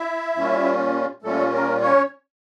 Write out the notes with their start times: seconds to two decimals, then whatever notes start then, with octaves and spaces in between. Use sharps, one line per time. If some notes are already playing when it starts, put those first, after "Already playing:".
Already playing: E4 E5
0.36 A#2 G3 C#4 F4
1.22 A#2 G3 A3 C#4 F4 A4
1.51 A#3 A#4
1.80 C#4 C#5